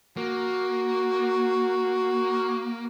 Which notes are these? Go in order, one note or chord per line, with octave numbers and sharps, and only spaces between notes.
A#3 F#4